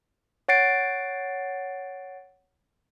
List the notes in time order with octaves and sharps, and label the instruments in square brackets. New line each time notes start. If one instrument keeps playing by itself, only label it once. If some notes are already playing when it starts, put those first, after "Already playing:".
[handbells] C#5 F#5 A6 C7 D7